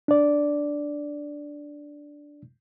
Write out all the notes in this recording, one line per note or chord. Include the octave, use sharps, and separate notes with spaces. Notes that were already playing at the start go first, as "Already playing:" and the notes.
D4 D5